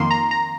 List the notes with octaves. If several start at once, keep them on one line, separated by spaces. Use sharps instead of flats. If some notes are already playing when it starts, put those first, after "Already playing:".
Already playing: F2 D#3 A#3 C6
A#5
A#5